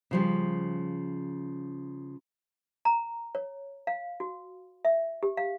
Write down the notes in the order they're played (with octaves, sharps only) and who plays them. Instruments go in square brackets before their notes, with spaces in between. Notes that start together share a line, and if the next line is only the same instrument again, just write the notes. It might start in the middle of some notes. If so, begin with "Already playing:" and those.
[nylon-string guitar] C#3 F3 G3
[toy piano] A#5
C#5
F5
F#4
E5
G4
F5